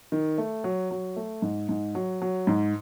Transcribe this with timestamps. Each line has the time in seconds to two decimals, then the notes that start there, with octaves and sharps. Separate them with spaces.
0.12 D#3
0.38 A3
0.64 F#3
0.91 F#3
1.16 A3
1.42 G#2
1.69 G#2
1.95 F#3
2.22 F#3
2.47 G#2